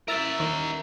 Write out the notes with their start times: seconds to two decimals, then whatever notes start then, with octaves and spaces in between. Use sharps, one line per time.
0.08 E4 A#4 E5 E6 A6
0.39 D#2 D#3 D#4